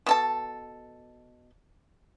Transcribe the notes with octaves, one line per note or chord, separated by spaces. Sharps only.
B2 A4 A5